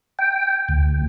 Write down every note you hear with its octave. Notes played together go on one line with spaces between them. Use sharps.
G5
D2